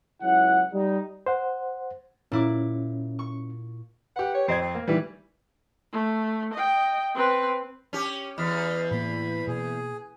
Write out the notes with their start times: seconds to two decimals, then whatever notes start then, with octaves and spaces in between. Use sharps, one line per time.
0.21 C#2 F#3 E4 F#5
0.73 G3 D#4
1.26 C5 F#5
2.32 A#2 C#4 E4 D6
3.19 C#6
4.16 G4 B4 F#5
4.34 C#5
4.48 F2 C4 D#5 G#6
4.61 C4
4.75 A#3
4.87 D#3 E3 G3 B4
5.92 A3
6.53 D#5 G5
7.14 C4 B4
7.93 C#4 G4
8.38 E2 D#5 B5 F6
8.91 A2 A#3 B5
9.47 B2 A#3 G#4